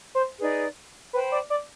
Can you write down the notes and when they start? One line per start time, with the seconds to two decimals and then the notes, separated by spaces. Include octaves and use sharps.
0.15 C5
0.40 D#4 G#4 B4 D5
1.13 B4 C5 G5 B5
1.32 D5
1.50 D5